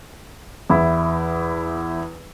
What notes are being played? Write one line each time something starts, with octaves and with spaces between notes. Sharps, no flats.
E2 E4